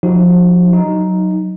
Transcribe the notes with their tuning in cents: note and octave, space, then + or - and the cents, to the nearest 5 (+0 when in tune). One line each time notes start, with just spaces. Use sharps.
F3 +25 D#4 +0 F#4 +40
F#3 +0 D#4 +0